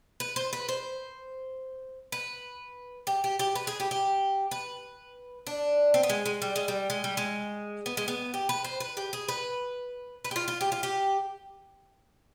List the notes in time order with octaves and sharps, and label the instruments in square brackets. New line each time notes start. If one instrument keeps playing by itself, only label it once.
[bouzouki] B4
C5
B4
C5
B4
G4
G4
G4
B4
G#4
G4
G4
B4
D4
C4
B3
G#3
G#3
G3
G#3
G3
G#3
G3
G#3
B3
G#3
B3
G4
B4
C5
B4
G4
G#4
B4
B4
G4
F4
F4
G4
F4
G4